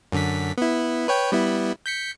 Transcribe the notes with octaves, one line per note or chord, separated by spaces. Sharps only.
F#2 D3 B6
B3 E4
B4 C#5 G5
G3 B3 E4
G6 B6 C#7